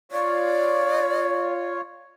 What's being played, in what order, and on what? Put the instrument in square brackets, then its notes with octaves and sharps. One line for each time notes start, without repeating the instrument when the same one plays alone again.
[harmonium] F4 C#5 [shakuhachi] D5